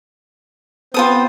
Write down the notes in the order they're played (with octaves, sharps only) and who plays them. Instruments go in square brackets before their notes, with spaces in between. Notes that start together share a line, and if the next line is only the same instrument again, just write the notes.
[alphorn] B3 [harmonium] C4 C5 [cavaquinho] F4 A4 D#6